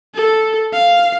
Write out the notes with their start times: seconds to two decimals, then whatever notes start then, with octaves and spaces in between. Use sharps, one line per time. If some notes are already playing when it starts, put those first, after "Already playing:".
0.14 A4
0.73 F5